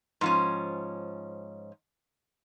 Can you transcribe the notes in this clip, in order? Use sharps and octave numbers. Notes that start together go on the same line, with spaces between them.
G#2 F3 C#4